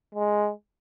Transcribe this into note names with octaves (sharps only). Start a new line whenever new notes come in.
G#3